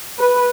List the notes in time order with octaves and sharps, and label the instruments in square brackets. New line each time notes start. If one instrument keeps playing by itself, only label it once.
[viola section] B4